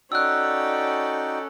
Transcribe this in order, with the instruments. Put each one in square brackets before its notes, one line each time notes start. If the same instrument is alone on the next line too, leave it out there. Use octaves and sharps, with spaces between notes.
[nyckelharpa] C#4 A4 [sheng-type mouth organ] D#4 F#4 G5 [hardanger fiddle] D5 [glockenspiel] E6 F#6